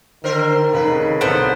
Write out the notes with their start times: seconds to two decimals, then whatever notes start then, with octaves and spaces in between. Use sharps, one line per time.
0.24 D3 D#3 A#4 C5
0.73 F1 C#3 B4
1.21 C2 B3 A4 C5 F#5 D7